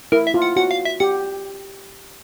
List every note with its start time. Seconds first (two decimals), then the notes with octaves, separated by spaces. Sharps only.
0.12 E4 A#4
0.27 E5
0.34 F4
0.42 F#5
0.56 F#4 F#5
0.71 F5
0.85 E5
1.00 G4 F#5